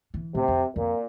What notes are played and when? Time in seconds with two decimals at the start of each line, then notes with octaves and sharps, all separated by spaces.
0.14 E3
0.34 A2 C3
0.48 F2
0.76 F2 A#2